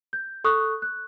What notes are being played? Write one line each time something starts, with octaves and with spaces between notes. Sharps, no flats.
G6
A4 C#6 D#6 F#6
F#6